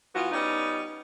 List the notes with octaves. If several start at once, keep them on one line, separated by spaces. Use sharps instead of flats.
E3 B3 F4 F#4
G3 B3 C#4 D#4